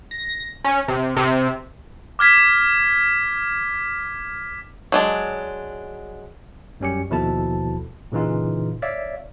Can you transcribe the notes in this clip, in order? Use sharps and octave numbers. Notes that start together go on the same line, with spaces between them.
A#6
C#4
C3
C3
D6 F6 G#6 B6
F#3 G#3 D4
F#2 G3 C#4 G4 C#7
D#2 B2 F3 E4 A4 A5
A#2 C#3 E3 D#4 F4
C#5 D5 E5 F5